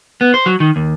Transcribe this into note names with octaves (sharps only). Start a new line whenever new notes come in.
B3
C5
F#3
D#3
D#2